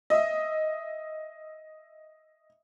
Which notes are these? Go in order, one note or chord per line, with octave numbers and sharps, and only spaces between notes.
D#5 E5